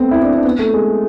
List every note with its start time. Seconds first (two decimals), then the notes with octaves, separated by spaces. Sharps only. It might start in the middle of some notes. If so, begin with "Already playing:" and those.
Already playing: A3 B3 C4
0.11 E4
0.23 D4
0.34 D4
0.44 B3
0.59 A3
0.74 G#3